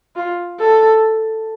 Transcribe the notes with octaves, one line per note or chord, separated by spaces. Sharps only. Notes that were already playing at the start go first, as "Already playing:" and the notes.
F4
A4